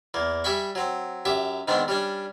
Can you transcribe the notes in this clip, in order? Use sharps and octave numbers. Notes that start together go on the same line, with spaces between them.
E2 A#3
G3 E5 G5 G#5 B5 C#6
F#3 C4
F#2 G4 E5
G#2 D#3 B3 C4 D4
G3 C#4 D4